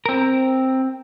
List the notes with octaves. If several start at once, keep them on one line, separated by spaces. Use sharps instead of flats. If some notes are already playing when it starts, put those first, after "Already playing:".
C4 A#4